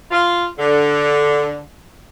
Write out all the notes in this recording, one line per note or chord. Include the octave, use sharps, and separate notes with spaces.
F4
D3